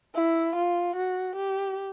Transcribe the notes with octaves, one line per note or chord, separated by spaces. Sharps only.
E4
F4
F#4
G4